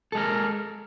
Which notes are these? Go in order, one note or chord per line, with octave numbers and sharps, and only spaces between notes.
G#3 A4 A#4